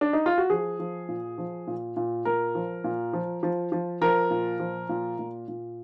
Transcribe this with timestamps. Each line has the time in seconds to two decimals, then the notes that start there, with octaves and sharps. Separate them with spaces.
0.01 D4
0.13 D#4
0.26 F4
0.38 F#4
0.50 F3 G#4
0.79 F3
1.09 A#2
1.38 F3
1.67 A#2
1.96 A#2
2.25 A#2 A#4
2.55 F3
2.84 A#2
3.13 F3
3.43 F3
3.72 F3
4.01 F3 A#4
4.30 A#2
4.60 F3
4.89 A#2
5.19 A#2
5.48 A#2